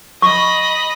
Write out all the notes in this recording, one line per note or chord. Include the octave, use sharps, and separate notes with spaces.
D#5 B5 C#6